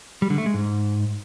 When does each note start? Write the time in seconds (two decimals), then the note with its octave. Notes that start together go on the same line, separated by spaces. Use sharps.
0.22 G3
0.30 D3
0.38 A3
0.46 G#3
0.54 G#2